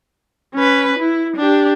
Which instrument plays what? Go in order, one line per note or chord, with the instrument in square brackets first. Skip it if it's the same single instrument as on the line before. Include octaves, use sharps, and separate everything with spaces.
[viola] C#4 B4
E4
D4 G4